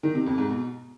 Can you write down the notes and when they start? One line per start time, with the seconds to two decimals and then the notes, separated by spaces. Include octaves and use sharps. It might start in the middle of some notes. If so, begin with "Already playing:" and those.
0.03 D#3
0.15 C3
0.26 F2
0.38 G#2
0.49 B2